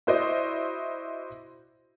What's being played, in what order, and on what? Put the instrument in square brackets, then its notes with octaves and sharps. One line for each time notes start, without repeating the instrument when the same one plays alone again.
[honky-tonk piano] E4 F#4 C5 D5 D#5